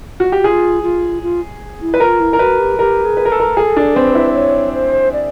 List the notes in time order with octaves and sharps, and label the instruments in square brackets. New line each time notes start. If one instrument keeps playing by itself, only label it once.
[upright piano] F#4
G4
[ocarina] F#4
[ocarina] F4 [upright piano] G#4
[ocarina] F4
F4
E4
[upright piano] B4
[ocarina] F4 [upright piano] A#4
[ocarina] E4
[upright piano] A#4
[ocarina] F#4 [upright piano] B4
[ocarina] G4
[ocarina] G4 [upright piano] A#4
[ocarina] G#4
[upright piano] B4
A#4
A4
A#4
[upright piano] G#4 [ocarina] A4
[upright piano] D4
[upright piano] C4 [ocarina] B4
[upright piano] E4
[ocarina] C#5
C5
D5